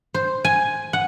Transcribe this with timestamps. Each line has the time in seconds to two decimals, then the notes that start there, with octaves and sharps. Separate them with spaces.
0.14 C5
0.45 G#5
0.93 F#5